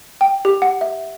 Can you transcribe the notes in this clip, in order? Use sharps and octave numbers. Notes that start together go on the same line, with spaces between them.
G5
G4
F#5
E5